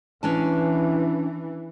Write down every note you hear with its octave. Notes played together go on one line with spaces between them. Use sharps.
E3 C#4 D4 A5